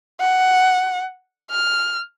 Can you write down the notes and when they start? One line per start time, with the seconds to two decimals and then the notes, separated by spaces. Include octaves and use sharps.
0.20 F#5
1.51 F6